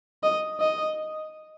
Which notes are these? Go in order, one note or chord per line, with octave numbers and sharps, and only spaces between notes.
D#5
D#5